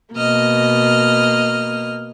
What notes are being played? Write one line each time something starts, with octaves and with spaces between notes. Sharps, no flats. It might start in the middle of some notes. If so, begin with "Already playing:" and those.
B2 A#3 D#5 F6